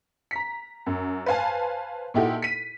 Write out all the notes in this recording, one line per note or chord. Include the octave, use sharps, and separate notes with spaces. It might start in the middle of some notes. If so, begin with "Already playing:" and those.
A#5 B6
F#2
B4 C5 F5 G#5 A5
A#2 D#4 E4 F#4 G4 A4
B6 D#7